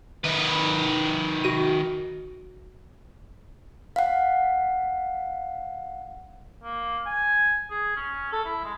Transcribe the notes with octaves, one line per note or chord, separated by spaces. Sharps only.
D#3 B4
F#4 D#7
F5 F#5
A#3
G#5
G#4
C#4
A4
E4
G#3